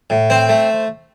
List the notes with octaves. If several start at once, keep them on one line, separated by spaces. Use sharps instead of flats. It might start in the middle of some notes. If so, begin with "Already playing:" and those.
A2
C4 C5
A3